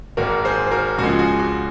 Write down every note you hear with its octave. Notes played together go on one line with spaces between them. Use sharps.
G#1 G#2 D#3 A#3 F#4 A#4
G#4 C5
C5
F#4 A#4
C#2 C#3 F3 G#3 F#4
G#4
F#4
F#4